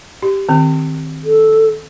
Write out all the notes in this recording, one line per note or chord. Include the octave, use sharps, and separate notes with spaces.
G4
D#3 C4
A4